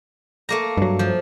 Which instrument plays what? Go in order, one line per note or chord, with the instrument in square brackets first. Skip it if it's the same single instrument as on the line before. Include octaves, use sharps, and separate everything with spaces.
[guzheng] A3 A#3 A#5
[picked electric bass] G2 F#3
[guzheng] F3